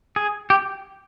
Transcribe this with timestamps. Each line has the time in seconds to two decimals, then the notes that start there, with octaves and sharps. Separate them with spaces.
0.16 G#4
0.50 G4